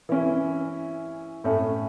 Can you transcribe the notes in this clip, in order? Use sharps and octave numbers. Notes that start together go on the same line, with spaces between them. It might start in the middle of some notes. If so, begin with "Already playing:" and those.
E3 C#4 E4
A2 A3 C#4 A4